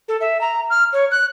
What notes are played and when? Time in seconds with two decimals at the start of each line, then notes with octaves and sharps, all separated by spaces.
0.08 A4
0.21 E5
0.41 A#5
0.70 F6
0.93 C#5
1.11 F#6